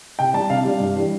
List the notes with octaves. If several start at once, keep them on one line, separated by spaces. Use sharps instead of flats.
C3 G5
G3 D4 A5
C3 F5
G3 D4
G2
E3 G3 D4